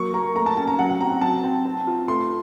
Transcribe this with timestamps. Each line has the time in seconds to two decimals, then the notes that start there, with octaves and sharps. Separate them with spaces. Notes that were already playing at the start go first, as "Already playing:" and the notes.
Already playing: F#3 A#3 C#6
0.13 A#3 A#5
0.35 A3 A#5
0.46 A5
0.56 C#4 A5
0.67 A#5
0.79 F#3 F#5
0.90 F#5
1.00 C4 A#5
1.21 F#3 A5
1.44 C4
1.65 C4
1.87 F4
2.08 A3 C6